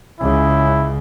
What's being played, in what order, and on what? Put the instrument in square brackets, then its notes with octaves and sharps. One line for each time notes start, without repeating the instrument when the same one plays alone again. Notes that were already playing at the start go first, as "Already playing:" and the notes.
[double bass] C#2 C#3 [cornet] E4